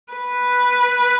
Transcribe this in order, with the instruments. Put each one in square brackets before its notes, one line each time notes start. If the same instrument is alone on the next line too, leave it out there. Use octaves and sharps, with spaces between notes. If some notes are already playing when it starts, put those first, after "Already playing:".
[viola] B4